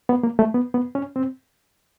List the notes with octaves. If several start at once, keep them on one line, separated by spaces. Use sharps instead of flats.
B3
A#3
A3
B3
B3
C#4
C4